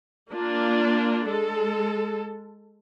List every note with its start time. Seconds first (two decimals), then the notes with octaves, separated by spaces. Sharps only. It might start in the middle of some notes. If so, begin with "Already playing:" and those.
0.32 A#3 D4 F4
1.28 G#3 A4